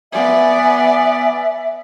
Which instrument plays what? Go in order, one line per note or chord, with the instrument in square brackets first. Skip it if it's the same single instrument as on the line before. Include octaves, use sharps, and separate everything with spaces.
[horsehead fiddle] B3 D5 [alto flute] E5 [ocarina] G#5